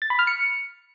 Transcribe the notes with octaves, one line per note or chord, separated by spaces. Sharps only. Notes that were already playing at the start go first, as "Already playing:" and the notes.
A6
B5
F6
C#7